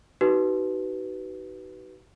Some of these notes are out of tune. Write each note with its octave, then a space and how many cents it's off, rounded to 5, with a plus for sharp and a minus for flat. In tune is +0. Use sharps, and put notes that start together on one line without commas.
D#4 +20 F#4 +45 B4 +0